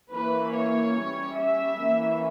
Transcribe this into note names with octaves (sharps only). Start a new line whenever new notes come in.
E3 A#3 C#4 B4
C#5
C#4
G3
E5
E3 A#3 C#4